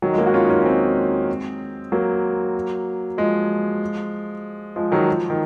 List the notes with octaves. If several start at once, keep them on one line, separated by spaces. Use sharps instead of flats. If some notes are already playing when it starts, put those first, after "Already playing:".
D#3 F#3
G#3
F#3 A#3
F#4
C#4 F4
D#4
C#4 F4
C#4
G#3 C4
F#3 A#3
F3 G#3
F3 G#3
D#3 F#3
F3
D#3